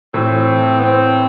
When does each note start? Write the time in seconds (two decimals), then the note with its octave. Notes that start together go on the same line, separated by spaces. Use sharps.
0.14 A2 E3 A3 C4
0.79 B3
0.84 C4